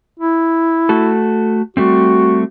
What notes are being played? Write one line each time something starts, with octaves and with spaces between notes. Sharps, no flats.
E4
A3 F#4 A4
G3 A3 C4 F#4